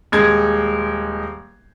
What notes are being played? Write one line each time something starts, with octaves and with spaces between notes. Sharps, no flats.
D#1 G#3 G#6